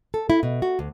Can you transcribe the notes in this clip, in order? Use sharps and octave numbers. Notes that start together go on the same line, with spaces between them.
A4
E4
B2
F#4
D2